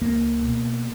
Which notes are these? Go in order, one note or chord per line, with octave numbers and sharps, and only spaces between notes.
C#2 A#3
B2